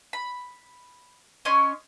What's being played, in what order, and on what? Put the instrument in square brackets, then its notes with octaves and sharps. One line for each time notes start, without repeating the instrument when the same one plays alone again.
[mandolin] B5
C#4 C#5 D#5 C6